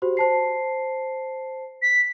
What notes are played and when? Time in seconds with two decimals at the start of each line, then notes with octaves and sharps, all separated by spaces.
0.02 F#4 G4 C5
0.17 C5 A5 C7
1.82 B6